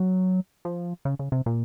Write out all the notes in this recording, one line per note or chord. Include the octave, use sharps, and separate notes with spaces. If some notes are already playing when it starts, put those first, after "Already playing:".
Already playing: F#3
F3
C#3
C#3
C3
A#2